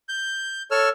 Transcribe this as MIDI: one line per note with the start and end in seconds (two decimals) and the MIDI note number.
0.09 0.62 91
0.71 0.89 69
0.71 0.89 73
0.71 0.89 88
0.71 0.89 89